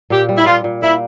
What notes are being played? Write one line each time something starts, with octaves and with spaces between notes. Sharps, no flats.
A#2 G4
G3
E4
A#2 F4
A#2
A#3 E4